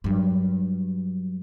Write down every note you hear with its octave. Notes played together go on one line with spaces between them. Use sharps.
G2 F#3